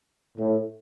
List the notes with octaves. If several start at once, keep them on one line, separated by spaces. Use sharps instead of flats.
A2